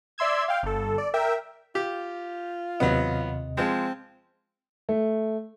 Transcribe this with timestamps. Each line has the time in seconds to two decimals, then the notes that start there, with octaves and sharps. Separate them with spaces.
0.18 D5 E5 C6 E6 G#6
0.48 F5 G5
0.63 G1 A4
0.98 D5
1.14 A#4 E5 G5
1.75 F4 G4
2.80 D#2 C3 F#3 B3 D#5
3.57 F3 G#3 C4
4.89 A3